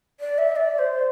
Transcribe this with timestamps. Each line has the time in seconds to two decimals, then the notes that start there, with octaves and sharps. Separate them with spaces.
0.20 D5
0.38 E5
0.56 D5
0.79 C5